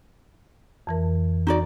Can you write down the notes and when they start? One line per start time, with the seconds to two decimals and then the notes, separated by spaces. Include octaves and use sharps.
0.87 F2 E3 A#4
1.47 D#4 F#4 D5